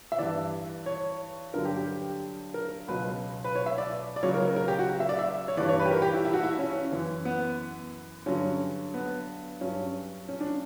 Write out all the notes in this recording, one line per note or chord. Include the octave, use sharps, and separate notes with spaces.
E5
G2 E3 D5
C#5
G2 D3 F#3 A#4
G4
G4
A#4
C#2 B2 F#3 B4
B4
C#5
E5
D5
D5
C#2 C#3 F#3 C#5
A#4
A#4
A#4
G4
F#4
E5
D5
E5
C#5
G2 E3 D5
C#5
B4
G4
A#4
G4
E4
E4
F#4
E4
C#4
F#2 E3
B3
G2 D3 F#3 C#4
B3
G2 F#3 C#4
C#4
D4